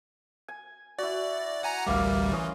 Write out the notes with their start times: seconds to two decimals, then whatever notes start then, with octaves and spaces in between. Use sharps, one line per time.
0.48 G#5
0.99 E4 F#4 D5
1.63 F#5 G#5 A#5
1.87 A1 D2 G3 A#3 E4 F5
2.32 E3 C#4 D#5 C6